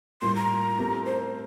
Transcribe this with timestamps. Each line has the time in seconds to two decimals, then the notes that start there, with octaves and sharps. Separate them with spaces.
0.22 A2 G3 A#3 F4 C6
0.36 A#5
0.78 A3 C4 G4 A#4
1.06 C5